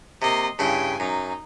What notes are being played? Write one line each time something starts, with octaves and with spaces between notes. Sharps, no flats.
C3 A#3 D#5 C6
G2 C#3 E4 G5 G#5
F#2 D#4